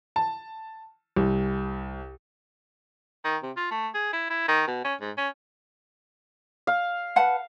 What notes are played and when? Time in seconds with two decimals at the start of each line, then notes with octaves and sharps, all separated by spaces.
0.16 A5
1.16 C2
3.24 D#3
3.43 C3
3.57 F4
3.71 A3
3.94 G#4
4.13 E4
4.30 E4
4.48 D#3
4.67 B2
4.84 C#4
5.01 G#2
5.17 C#4
6.67 F5
7.16 B4 F#5 A5